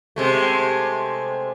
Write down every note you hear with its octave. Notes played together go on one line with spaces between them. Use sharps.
C3 G#3 A3